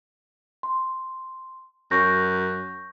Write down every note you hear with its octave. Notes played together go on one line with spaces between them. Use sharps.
C6
F#2 C#6 G6 A#6